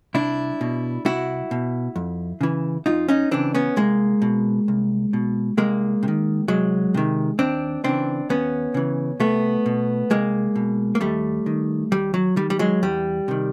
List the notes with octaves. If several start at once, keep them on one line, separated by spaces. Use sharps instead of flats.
C2 D4 E4
B2
C2 E4 F#4
B2
F2
C#3 E3
F2 D#4 F4
C#4 D#4
C#3 E3 C4 D4
B3 C#4
C2 G#3 A#3
B2
C2
B2
C2 G#3 A#3
C3
D#3
C2 F#3 G#3
C3 D#3
D#2 C4 D4
C#3 E3 C4 D4
D#2 B3 C#4
C#3 E3
C2 A3 B3
B2
C2 G#3 A#3
B2
A#3
D#2 G3 A3
D#3
D#2 G3
F#3
D#3 G3
G3
F#3 G#3
E2 G3
C3 D#3